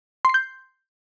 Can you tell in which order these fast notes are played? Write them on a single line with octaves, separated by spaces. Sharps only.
C6 C7 G6